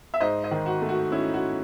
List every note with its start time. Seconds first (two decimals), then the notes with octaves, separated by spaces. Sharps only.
0.14 E5
0.20 G#2 C5 D#5
0.43 C5 D#5
0.51 D#3
0.66 F#4
0.82 A3
0.89 F#4
1.12 C#4 E4
1.34 F#4